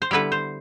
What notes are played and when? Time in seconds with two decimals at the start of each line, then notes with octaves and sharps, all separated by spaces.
0.02 C5
0.11 D3 G3 B3 E4 B4
0.32 C5